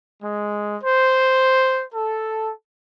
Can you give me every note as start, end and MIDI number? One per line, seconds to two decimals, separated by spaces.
0.20 0.75 56
0.82 1.83 72
1.93 2.52 69